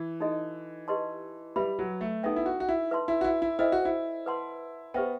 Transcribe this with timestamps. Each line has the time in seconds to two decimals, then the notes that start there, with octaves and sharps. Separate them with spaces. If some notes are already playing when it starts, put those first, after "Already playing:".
Already playing: E3
0.20 D#4 F#4 A4 D#5
0.88 G4 B4 D#5 A5 C6
1.56 G3 B4 E5 B5
1.79 F#3
2.01 A3
2.23 B3 D#4 A4 E5 G5
2.36 E4
2.46 F#4
2.60 F#4
2.69 E4
2.91 B4 E5 A5 C6
3.08 E4
3.21 F#4
3.24 E4
3.42 E4
3.58 E4 A4 C5 D#5 G5
3.72 F#4
3.85 E4
4.26 B4 F#5 A5 C6
4.94 B3 G4 C5 E5 G5